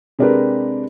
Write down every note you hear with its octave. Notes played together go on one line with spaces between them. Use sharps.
C3 G#3 D4 G4 A#4 B4